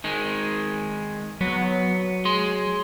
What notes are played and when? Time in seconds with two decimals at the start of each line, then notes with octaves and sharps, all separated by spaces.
0.04 D#3 G#3
1.41 F#3 B3
2.25 G#4 C6